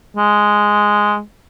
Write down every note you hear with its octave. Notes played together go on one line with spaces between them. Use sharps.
G#3